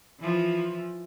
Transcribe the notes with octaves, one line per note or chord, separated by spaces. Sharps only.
E3 F3